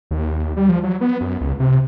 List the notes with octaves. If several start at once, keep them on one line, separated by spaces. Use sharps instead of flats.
D#2
G3
F3
F#3
B3
F#2
C#2
C3